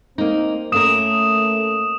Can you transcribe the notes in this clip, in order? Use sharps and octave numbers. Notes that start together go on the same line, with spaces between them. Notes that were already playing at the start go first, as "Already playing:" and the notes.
A#3 C4 D#4
A3 A#3 C#4 A#4 D#6 E7